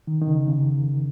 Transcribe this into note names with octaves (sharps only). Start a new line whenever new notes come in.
D#3
D#3
C#3
C#3